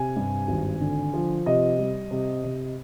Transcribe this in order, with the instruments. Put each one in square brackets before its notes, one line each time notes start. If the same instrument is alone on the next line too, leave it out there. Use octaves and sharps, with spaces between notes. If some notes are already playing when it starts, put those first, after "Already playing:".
Already playing: [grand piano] C3 G#5
G2
G#1
D3
F3
C3 D#5
G3
C3
C3